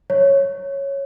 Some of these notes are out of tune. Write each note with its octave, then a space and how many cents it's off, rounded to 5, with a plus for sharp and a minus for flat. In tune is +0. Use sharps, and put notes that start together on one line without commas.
C#5 -5